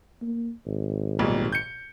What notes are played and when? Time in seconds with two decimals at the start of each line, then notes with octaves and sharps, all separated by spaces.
0.22 A#3
0.66 G#1
1.19 B1 A#2 G3
1.52 G6 C#7